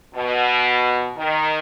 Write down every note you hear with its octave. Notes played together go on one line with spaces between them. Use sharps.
B2
D#3